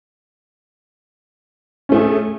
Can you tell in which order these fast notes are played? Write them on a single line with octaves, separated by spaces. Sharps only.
C#4 A3 G#4